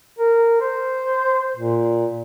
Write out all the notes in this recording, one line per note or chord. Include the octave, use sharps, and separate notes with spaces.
A#4
C5
A#2